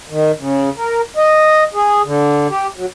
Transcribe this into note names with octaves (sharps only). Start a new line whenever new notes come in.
D#3
C#3
A#4
D#5
G#4
D3
G4
F#3